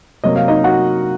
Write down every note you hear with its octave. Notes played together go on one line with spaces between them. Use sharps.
C3 F#3 A#3 D#5
F5
D#4 D#5
F#4 F#5